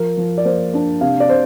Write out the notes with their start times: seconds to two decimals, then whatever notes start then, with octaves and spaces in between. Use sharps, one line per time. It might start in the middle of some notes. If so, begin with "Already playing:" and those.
Already playing: F3 A#4
0.17 F3
0.38 D5
0.45 A#3 C5
0.74 D4
1.01 C3 F5
1.20 D5
1.29 C3 C5